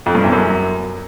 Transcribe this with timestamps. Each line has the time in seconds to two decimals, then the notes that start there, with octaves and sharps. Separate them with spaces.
0.06 F2
0.15 G2
0.24 E2
0.32 F#2